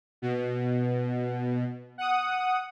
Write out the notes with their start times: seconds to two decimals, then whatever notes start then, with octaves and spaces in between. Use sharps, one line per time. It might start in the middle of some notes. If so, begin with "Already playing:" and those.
0.22 B2
1.98 F#5 D#6